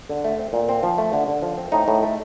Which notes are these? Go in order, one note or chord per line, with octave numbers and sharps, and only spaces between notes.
D3
A3
C4
A#2
C4
F3
A3
D3
D3
F3
C4
A2 D#4
A2
A3